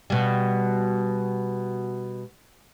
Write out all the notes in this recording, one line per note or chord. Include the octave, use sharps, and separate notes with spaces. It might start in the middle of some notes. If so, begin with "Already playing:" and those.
B2 G3